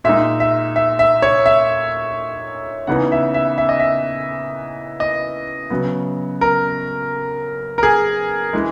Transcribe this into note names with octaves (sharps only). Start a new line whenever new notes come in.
A#2 G#3 D#4 E5
E5
E5
E5
C#5
E5
C#3 E3 B3 D#4 F#5
E5
E5
E5
D#5
E5
D#5
C#3 F#3 B3
A#4
A#4
G#4
E3 G#3